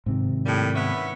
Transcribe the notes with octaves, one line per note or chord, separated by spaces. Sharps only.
G#2 C3 D#3
A2 G3 A#3
B3 C#4 E5